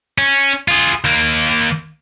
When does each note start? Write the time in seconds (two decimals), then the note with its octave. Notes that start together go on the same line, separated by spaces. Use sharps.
0.18 C#4
0.68 F4 G#4
1.04 D#2 A#3